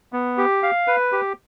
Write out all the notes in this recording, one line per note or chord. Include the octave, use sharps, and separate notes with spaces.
B3
G4
F5
B4
G4